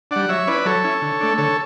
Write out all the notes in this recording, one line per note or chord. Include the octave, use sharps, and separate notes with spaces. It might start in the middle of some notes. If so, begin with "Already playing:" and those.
G3 D4 D5 F#5
F#3 C#5 E5
C#4 E4 B4 D5
F#3 A4 C#5
C#4 E4
D3
A3 D4
D3 A4 C#5